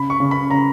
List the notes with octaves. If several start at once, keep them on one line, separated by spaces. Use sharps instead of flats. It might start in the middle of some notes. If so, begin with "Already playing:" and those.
Already playing: C#3 B5
C#6
C#3
B5
C#3 A#5